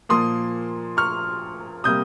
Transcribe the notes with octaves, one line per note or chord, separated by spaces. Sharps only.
A#2 F3 A#3 C6 D#6
C#6 F6
C3 G3 A#3 D#6 G6